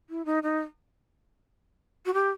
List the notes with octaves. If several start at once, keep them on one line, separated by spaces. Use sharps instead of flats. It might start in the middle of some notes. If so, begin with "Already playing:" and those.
E4
D#4
D#4
F#4
G4